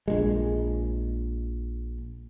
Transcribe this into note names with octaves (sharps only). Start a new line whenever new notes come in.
A#1 G#3